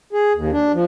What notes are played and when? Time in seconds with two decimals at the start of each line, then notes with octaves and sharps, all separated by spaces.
0.13 G#4
0.34 D#2
0.52 D4
0.73 F3